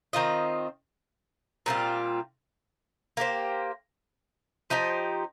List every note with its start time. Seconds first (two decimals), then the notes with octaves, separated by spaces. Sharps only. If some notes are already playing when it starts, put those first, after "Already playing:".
0.13 D#3 C4 F4 D#5
1.66 A#2 G3 C4 F4
3.17 A#3 G4 C5
4.70 F3 D#4 G4 C5